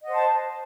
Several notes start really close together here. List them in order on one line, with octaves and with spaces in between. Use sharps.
D#5 F#5 C5 A5